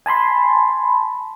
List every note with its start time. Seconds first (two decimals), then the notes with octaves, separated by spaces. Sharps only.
0.06 G#5 A5 B5 C6